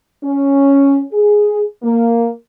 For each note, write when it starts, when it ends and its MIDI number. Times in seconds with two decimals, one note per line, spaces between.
0.24 1.03 61
1.13 1.64 68
1.83 2.30 58